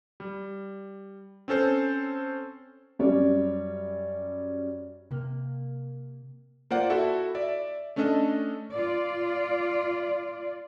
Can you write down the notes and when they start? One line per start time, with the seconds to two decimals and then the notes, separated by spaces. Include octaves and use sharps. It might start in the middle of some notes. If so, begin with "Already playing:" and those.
0.20 G3
1.48 C4 C#4 A4 C5 C#5
2.99 F#2 G3 C#4 C#5 D5
5.11 C3 A#3
6.71 A#3 F4 C5 D5 F#5
6.90 E4 F#4 A4 E5
7.35 D5 E5
7.96 A3 C#4 D4 A4 D#5
8.71 F4 D5